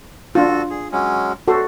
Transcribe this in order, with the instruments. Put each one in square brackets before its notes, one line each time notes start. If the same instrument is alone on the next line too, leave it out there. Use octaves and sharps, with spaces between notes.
[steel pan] D4 F4 [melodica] F#4 A4
[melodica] G#4
F#3 G#3 C#4
[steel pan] F#4 A4 [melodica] C5